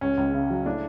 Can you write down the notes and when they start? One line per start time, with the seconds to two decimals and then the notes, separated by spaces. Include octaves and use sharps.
0.01 C#2 C#4
0.17 C#2
0.34 C#3
0.50 F#3
0.66 A2 D4